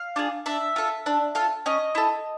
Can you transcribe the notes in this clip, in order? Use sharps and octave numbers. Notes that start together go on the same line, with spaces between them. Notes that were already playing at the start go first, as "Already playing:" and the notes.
Already playing: F5
D4 F4 G#4
D4 E5
F4 A4
D4
F4 A4
C#4 D#5
E4 A4